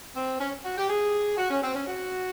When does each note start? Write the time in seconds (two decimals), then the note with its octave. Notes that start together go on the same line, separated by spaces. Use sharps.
0.15 C4
0.40 C#4
0.64 F#4
0.77 G4
0.89 G#4
1.38 F#4
1.50 C#4
1.62 C4
1.75 C#4
1.87 F#4